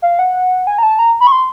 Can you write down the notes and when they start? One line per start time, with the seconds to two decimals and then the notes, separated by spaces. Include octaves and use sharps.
0.02 F5
0.19 F#5
0.67 G#5
0.78 A#5
0.83 A5
0.99 A#5
1.20 B5
1.27 C#6
1.32 C6